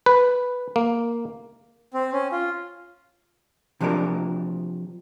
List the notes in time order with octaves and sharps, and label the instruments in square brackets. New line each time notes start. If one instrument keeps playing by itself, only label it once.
[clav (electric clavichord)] B4
A#3
[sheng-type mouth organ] C4
C#4
F4
[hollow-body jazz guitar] C3 F3 F#3 D4 G4 A#4